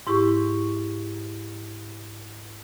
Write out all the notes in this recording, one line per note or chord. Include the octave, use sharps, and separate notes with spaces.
G#2 E4 G4 C#6